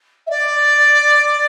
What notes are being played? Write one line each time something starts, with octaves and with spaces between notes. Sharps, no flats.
E5
D5